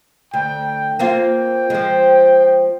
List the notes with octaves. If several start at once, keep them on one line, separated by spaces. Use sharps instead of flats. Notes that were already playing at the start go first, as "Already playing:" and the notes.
D2 G5
A#3 C4 F4 G5
F3 G#3